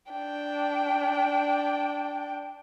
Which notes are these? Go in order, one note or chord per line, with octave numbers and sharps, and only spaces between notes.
D4 G5